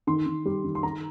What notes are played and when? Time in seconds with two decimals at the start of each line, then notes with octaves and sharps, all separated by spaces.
0.07 D#3 C6
0.26 D#3
0.46 G3
0.64 D#3
0.75 C6
0.83 D#3 A#5